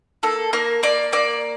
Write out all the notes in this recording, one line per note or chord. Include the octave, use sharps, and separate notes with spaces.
A#3 A4
A#3 A#4
A#3 D5
A#3 D5